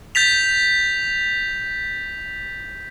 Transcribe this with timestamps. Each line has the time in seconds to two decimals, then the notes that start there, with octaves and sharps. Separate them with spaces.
0.15 G6 A6 B6 F7